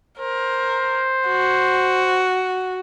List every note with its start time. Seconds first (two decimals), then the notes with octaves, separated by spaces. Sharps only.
0.19 A#4 C5
1.27 F#4